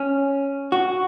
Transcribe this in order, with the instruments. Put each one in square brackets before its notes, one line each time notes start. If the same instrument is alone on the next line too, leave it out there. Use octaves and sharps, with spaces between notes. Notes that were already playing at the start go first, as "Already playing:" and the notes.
Already playing: [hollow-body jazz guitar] C#4
F#4